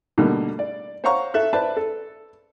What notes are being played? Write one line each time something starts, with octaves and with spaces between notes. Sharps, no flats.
B2 D3 G3 A3 A#3
D5
C5 C#5 F5 F#5 A#5 C#6
A4 E5 F#6
B4 C5 D5 E5 A5
A4